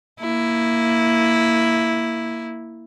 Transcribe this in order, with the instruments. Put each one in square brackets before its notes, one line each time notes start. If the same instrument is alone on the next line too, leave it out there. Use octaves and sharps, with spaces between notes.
[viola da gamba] A#3 E4